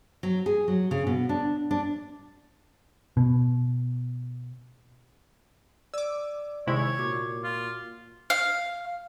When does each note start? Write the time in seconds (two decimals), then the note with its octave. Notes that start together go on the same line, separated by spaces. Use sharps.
0.23 F#3
0.46 G#4
0.68 F#3
0.91 C#3
1.07 B2
1.29 D4
1.71 D4
3.17 B2
5.94 D5 D6 E6
6.67 C3 D#3 G#3 E4 C#5
6.99 A#2 F#4 D6
7.44 F4
8.30 F5